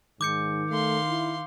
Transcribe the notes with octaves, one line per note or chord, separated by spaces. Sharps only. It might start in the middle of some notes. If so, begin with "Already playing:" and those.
G#2 D#3 D6 G6 C#7
A3 F5 C6
E4